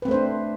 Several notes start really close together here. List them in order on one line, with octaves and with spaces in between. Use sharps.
B4 C4 A3 C5 D4